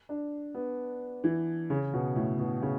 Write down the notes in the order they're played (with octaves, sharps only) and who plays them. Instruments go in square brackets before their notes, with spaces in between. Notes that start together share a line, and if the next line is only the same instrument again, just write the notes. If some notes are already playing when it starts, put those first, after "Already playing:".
[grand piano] D4
B3
E3
C#3
B2
A2
B2
C#3